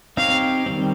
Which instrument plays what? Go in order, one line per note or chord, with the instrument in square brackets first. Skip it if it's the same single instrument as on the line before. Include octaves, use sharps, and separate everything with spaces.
[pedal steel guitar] C4 D#4 G4 C#5 [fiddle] F5
[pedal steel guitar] D#3 G3 C4